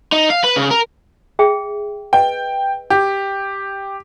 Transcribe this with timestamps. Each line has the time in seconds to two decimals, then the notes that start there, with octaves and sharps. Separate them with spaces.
0.12 D#4
0.30 F5
0.44 B4
0.56 C#3
0.71 A#4
1.39 G#4 E5 G5
2.13 B4 D#5 G5
2.90 G4